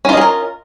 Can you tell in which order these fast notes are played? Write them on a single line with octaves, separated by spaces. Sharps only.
C#4 F4 D#5 G#4 A#4